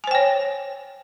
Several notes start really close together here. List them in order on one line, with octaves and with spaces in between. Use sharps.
G#5 C5 G5 C#5